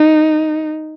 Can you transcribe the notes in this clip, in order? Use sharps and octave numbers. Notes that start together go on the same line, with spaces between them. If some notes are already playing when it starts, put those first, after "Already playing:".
Already playing: D#4